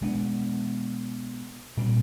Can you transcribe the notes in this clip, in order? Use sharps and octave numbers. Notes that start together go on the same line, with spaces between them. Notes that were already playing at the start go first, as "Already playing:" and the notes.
B2 G#3 B3 D4
A#2 G3 C4